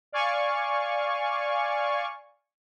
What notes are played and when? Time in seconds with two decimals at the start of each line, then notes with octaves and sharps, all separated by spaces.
0.12 D5 F5 G#5 C#6